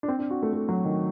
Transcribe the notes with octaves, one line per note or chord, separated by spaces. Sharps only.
D4
C4
D4
F#4
A3
A3
F#3
D#3